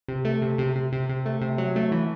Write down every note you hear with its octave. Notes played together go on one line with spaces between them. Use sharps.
C3
A3
C3
C3
C3
C3
C3
A3
C3
F#3
A3
E3